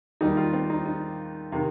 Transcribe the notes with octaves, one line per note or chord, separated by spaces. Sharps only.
D#2 D#3 G3 D#4
F4
C4
D#4
D#4
C3 D#3